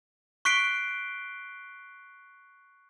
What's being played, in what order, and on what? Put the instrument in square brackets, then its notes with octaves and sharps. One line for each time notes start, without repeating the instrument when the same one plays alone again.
[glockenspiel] C#6 F#6 B6 C7 D7 G7